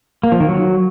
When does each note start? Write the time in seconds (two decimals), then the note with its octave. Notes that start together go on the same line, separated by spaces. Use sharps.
0.23 A#3
0.32 F3
0.40 D#3
0.49 F#3